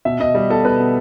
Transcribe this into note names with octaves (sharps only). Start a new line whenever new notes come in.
B2 E5
B2 D#5
G3
B3 A4
B2 B4
B2